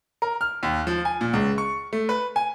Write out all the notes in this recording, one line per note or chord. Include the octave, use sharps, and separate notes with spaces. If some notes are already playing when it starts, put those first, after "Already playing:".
A#4
F6
D#2
F3
G#5
A#2
C#2
C#6
A3
B4
G#5